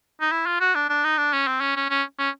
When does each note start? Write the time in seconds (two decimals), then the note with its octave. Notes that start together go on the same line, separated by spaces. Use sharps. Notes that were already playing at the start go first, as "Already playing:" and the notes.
0.21 D#4
0.32 E4
0.46 F4
0.61 F#4
0.75 D4
0.90 D4
1.04 D#4
1.18 D4
1.33 C#4
1.48 C4
1.61 C#4
1.76 C#4
1.90 C#4
2.19 C#4